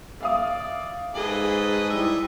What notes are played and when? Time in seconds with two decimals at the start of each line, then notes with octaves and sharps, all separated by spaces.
0.21 D5 E5 F5 D#6
1.15 G#2 G#4 A4 B4 D#5
1.90 G3 E4 D#5 E5